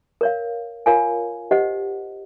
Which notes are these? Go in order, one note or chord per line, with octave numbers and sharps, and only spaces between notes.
A#4 C#5 F5
F4 A#4 C#5 F5 G#5
G4 C5 D#5 F#5